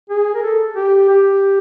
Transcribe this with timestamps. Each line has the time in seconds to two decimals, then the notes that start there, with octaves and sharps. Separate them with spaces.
0.10 G#4
0.35 A#4
0.43 A4
0.76 G4
1.09 G4